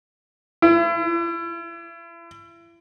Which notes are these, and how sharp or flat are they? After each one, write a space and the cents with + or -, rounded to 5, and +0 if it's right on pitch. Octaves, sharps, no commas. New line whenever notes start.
E4 +40